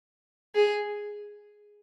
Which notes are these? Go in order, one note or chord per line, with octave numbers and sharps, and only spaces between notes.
G#4